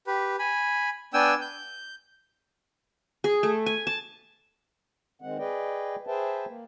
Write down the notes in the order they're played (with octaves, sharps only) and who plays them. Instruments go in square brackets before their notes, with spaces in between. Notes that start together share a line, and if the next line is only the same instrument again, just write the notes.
[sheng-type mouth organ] G4 B4
G#5 B5
B3 D4 G5 G#5 E6
G6
[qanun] G#4
A3
G#5
A5
[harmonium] D#3 G#3 C4 F#5
G#4 B4 D5 D#5 G5
G#4 B4 C5 E5 G5 A5
A#3